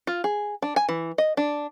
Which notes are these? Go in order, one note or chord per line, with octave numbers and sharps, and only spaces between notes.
F4
G#4
D4
G#5
E3
D#5
D4